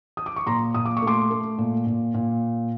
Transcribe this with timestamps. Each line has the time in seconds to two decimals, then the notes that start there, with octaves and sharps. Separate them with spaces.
0.17 D#6
0.26 D6
0.36 C#6
0.46 A#2 A#5 C6
0.74 A#2 D#6
0.86 D6
0.97 C#6
1.02 A3
1.07 C6 D6
1.31 A3
1.58 A#2
1.86 A#2
2.14 A#2